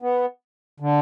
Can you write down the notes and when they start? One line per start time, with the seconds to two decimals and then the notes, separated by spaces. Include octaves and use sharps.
0.02 B3
0.80 D3